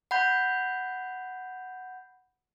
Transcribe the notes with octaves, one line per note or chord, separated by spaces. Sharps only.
F#5 B5 G6